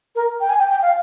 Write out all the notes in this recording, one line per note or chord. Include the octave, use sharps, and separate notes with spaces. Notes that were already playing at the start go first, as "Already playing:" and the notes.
A#4
G5
G#5
G5
G5
F5